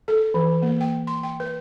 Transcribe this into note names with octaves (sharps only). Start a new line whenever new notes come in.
A4
E3
A#3
G5
C6
G5
B4